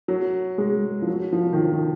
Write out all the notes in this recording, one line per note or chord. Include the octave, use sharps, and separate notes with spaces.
F#3
G#3
F3
F#3
F3
D#3
F3
D#3